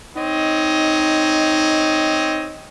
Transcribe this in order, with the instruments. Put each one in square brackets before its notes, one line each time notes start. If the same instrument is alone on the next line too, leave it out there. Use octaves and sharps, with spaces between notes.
[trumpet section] C4 C#5 D#5 [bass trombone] D#4